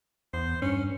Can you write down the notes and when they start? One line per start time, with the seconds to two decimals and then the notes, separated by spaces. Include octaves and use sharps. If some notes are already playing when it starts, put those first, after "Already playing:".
0.34 E2 C5
0.62 G2 C#4